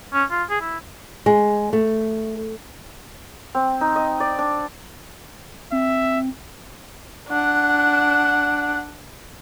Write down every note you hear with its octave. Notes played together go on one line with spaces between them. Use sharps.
C#4
F4
G#4
E4
G#3
A3
C4
D#4
D#5
D5
D4
C4 E5
D4 F#5